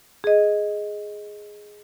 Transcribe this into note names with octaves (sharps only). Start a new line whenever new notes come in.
G#4 D#5